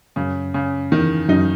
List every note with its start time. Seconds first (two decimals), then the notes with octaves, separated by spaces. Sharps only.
0.16 F#2 C#3
0.54 C#3
0.92 E2 D#3
1.29 F#2 D#4